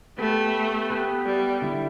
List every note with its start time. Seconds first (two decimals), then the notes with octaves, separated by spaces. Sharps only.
0.18 A3 B3 G4 B4
0.90 B3 G4 B4
1.25 G3
1.62 D3 G3 E4